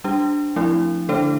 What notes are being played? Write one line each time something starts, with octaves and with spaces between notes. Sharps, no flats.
G3 D4 G4
F3 A3 C4 E4
D3 A3 D4 A4 C5